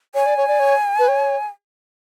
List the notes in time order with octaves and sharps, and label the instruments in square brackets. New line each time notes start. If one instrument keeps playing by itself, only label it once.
[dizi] C#5 [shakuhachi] G#5
[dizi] D5
C#5
D5
C#5
B4
C#5